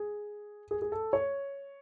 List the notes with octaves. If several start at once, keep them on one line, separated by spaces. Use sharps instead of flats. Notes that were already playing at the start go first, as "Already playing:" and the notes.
Already playing: G#4
G#4
G#4
A4
C#5